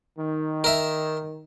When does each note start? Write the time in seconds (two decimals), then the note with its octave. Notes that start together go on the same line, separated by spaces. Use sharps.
0.16 D#3
0.64 A#4 E5